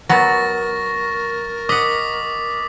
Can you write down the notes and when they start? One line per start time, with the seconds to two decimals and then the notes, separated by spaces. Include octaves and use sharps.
0.09 F#3 B3 A#4 C#6 A6 A#6
1.69 D#5 F#5 D6 D#6 B6